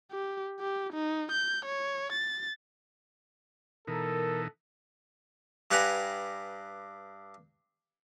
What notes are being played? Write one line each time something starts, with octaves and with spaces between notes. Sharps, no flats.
G4
G4
D#4
G6
C#5
A6
B2 E3 D#4 A4 A#4
G2 G4 B4 F#5 G#5 A#5